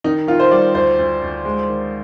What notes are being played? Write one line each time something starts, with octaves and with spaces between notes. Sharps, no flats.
D#3 D#4
D#3 F4
C5
G3 D5
D2 C5
D2
D2
G#3
D#3